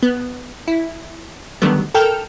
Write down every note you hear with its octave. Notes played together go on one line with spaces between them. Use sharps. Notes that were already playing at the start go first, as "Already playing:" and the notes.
B3
E4
D3 D#3 F#3 G3 A3 B3
A4 A#4 G5 F6